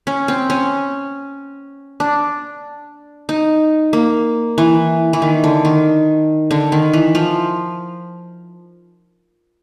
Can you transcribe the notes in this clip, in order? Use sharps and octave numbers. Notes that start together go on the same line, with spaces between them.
C#4
C4
C#4
D4
D#4
A#3
E3
E3
D#3
D3
D#3
D3
D#3
E3
F3